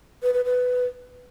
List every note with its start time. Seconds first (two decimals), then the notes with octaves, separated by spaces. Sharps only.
0.23 B4
0.34 B4
0.45 B4